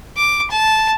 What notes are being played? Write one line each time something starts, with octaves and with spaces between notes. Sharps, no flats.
D6
A5